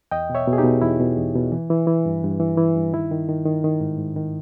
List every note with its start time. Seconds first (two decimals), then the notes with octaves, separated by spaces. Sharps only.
0.11 E2 D#5 G5
0.30 B2
0.35 C#5 E5
0.47 B2
0.53 G#4
0.58 D#4 G4
0.64 B2
0.82 E2 E4
1.00 B2
1.17 E2
1.35 B2
1.52 E3
1.70 E3
1.87 E3
2.05 G2
2.23 G2
2.40 E3
2.57 E3
2.76 G2
2.93 D#3 E4
3.11 D#3
3.28 D#3
3.45 D#3
3.64 D#3
3.80 G#2
3.98 G#2
4.16 D#3